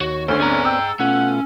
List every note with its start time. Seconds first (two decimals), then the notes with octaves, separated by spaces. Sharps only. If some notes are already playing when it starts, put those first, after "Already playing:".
0.01 D#2 F#4 C#5
0.28 D2 D3 C#4 C5
0.40 B3 C4 G#4 D5 A#5
0.65 G5 E6
1.00 B2 A3 C#4 F4 F#5